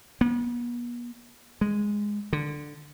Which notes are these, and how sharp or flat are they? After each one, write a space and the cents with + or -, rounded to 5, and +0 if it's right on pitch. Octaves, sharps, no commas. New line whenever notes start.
B3 -45
G#3 -5
D3 +10